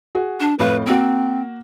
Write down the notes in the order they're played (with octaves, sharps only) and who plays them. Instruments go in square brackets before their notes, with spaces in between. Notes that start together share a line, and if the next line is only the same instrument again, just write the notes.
[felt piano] F#4 G#4
[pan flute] D4
[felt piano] F2 A2 F5 [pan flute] B4
[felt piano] A#3 F#4 [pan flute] C4